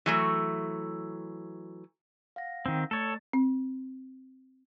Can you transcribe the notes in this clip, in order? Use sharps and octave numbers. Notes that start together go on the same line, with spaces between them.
E3 F#3 A3
F5 F#5 A#6
D#3 C4
A3 A4 C#5 A6
C4